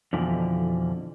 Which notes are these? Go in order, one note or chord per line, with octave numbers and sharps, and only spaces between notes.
F2 B2 D3 E3 F3